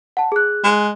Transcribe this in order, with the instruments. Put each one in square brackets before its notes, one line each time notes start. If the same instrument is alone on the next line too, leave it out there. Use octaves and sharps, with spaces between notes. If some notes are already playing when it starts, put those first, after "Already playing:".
[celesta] F#5 A5
G#4 F#6
[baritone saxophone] G#3